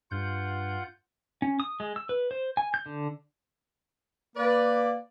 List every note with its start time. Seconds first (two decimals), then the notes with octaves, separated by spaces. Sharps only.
0.11 G2 F4 F#5 G6
1.42 C#4
1.60 D#6
1.80 G#3
1.96 E6
2.09 B4
2.31 C5
2.57 G#5
2.74 G6
2.86 D3
4.36 A#3 B4 D5